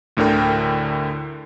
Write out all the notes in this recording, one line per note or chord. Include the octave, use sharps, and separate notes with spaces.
D2 A2 D3 A#4 G5